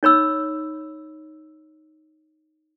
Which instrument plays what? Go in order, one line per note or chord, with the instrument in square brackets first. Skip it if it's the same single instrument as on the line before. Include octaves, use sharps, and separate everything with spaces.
[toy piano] D#4 C#5 B5 E6